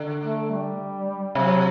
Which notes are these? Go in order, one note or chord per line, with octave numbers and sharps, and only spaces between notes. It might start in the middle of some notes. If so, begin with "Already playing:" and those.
Already playing: D3
A3
G3
C3 F#3